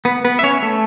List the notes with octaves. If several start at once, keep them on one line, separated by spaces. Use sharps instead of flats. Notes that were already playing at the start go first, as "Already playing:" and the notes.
B3 B4
B3 B4
E5
C#4 C#5
A3 A4